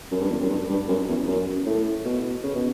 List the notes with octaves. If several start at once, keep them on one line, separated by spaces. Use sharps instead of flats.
F#2
G2
E2
F#2
G2
G2
F#2
E2
F#2
A2
B2
C#3
B2